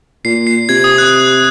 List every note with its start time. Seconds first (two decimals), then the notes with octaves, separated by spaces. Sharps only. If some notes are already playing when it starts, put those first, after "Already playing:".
0.25 A#2 C7
0.47 C7
0.69 C3 G#6
0.84 D#6
0.98 F#6